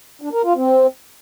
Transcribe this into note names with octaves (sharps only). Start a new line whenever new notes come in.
D4
A#4
F4
C4